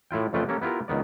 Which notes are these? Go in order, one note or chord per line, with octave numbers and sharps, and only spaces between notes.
A2 E4 F4 G5
F2 C#3 A3 F4 B4 G5
A#3 C#4 G4 A4
B3 E4 F4 G4 A#4
C#2 D#3 B3 D5